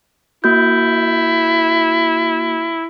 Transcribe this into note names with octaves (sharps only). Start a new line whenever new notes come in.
A#3 E4 F#4 G6